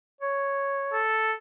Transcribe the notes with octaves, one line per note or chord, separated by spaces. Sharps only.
C#5
A4